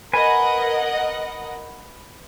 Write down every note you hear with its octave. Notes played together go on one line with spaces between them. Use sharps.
A#4 B4 D#5 F#5 G#5